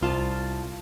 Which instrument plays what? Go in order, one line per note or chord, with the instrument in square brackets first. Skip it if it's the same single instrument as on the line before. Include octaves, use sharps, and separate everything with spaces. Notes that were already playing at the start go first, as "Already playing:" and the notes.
[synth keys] C2 F4 A5